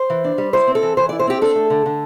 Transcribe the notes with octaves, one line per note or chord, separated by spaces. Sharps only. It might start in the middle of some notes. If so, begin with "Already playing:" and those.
Already playing: C5
E3
D4
G3
E4 C5
C4
A4
E3
E3 C5
E4 D5
C5
C4 G4
D4 A4
A3
D3
D3